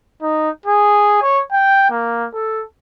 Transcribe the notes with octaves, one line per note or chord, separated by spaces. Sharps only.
D#4
G#4
C#5
G5
A#3
A4